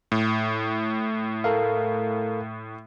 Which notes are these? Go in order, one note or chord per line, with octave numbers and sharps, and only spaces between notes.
A2
A4 A#4 F5